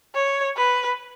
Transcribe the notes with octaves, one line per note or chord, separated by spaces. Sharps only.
C#5
B4